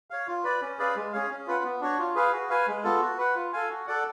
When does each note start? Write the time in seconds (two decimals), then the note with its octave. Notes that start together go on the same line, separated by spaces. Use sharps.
0.10 C#5 F5
0.27 F4
0.44 B4 D5
0.62 C#4
0.79 G#4 B4 D5 F5
0.96 G#3
1.13 C#4 G#4 C#5 F5
1.30 C#4
1.47 F4 B4 F#5
1.64 B3
1.81 D4 F#4 C#5
1.99 F4
2.15 G#4 B4 F5
2.33 F#4
2.50 B4 F5 G#5
2.67 G#3
2.83 B3 F4 A4
3.01 F#4
3.18 B4 F#5
3.35 F4
3.53 A4 F5 G#5
3.69 F#4
3.87 A4 D5 F#5